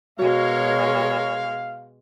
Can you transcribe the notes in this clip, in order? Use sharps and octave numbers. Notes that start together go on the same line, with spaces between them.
B2 G#3 F#4 A#4 C#5 F5